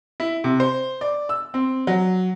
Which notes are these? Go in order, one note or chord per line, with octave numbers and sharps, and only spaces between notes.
E4
C3
C5
D5
E6
C4
F#3